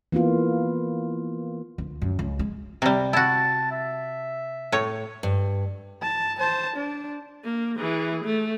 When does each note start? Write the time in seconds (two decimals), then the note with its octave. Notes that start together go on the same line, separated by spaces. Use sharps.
0.12 E3 A#3 B3 F4
1.78 D2
2.02 F#2
2.19 C#2
2.39 G#3
2.82 C3 G3
3.13 E4 F#4 A5
3.71 E5
4.72 A2 C#5
5.23 G2
6.02 A5
6.39 C5 A5
6.75 D4
7.44 A#3
7.77 E3 G#4
8.25 A3